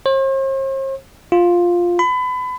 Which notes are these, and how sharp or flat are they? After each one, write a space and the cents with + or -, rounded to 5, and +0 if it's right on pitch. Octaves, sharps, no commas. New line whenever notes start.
C5 +45
F4 +5
B5 +30